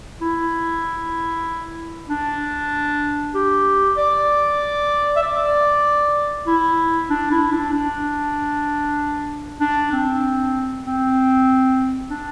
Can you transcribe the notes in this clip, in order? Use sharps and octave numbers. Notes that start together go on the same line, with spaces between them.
E4
D4
G4
D5
E5
D5
E4
D4
E4
D4
D4
D4
C4
C4
D4